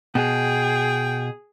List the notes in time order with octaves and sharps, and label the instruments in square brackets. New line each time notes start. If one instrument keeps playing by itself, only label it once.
[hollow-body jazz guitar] B2 [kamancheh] G#4 [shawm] G5